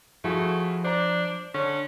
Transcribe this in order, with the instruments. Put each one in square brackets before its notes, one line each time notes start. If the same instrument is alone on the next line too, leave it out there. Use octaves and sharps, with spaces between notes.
[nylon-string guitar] F3 [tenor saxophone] A3 [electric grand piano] E4 F#4 G#4
[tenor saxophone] D4 [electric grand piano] C5 A#5
[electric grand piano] D3 [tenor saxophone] C#4